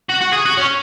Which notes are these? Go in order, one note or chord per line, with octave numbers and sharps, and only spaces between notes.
F#4
F#4
G#4
F#4
C#4